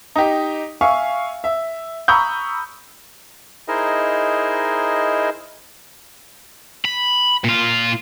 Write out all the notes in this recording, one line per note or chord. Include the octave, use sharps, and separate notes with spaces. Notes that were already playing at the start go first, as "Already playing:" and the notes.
D#4 G4
E5 F5 G#5 C#6
E5
A#5 B5 C#6 D#6 E6 G6
D#4 E4 G#4 A#4 C5 D#5
B5
A#2 F4